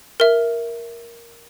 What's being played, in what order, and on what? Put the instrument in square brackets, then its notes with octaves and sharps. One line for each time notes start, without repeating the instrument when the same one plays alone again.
[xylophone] A#4 E5